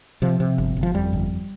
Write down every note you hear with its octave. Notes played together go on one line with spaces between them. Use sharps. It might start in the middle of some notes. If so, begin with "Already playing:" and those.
C3 F3
C3
G1
G1
F3
F2 G3
G1